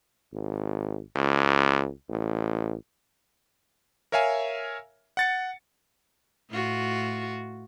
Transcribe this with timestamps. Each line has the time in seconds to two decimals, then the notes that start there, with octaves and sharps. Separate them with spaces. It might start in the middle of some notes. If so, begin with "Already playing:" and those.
0.33 G#1
1.16 C#2
2.09 A1
4.12 A#4 C#5 E5 F5 G#5
5.17 F#5 A6 C#7
6.50 A2 F4 F#4